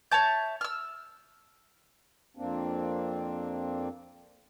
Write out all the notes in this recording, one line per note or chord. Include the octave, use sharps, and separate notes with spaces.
C#5 E5 A5 G6
E6 F6
F2 A#3 C4 D4